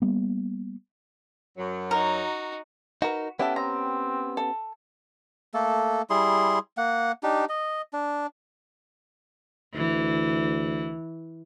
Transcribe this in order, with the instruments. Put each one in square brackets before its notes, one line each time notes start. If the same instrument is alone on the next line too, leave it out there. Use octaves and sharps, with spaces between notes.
[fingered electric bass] G3 A#3 B3
[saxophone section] F#2 F#3
[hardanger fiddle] D#4 F#4 [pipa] A#4
[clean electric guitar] D#4 A#4 [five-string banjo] F#4 B4
[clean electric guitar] B3 C#4 G4 [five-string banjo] E4 A4 [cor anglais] F#5
[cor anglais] C4 [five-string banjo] A#5
[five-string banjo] A4
[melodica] A3 A#3 A4
G3 E4 G#4 C6
A#3 F#5
D4 D#4 G4
D#5
D4
[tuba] D2 [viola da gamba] E3